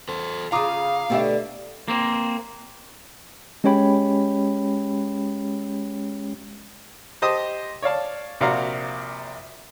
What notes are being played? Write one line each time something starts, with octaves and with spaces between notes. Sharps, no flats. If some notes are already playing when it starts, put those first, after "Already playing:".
A4 C5
C#3 F4 F5 A#5 D6 D#6
B2 D3 A3 D4 G4 E5
A#3 C4
G#3 C#4 G4 C#5 G5 B5
G4 C5 D#5 A5 D#6
C#5 D5 F5 A5
A#1 C3 F#4 D5 F5 A#5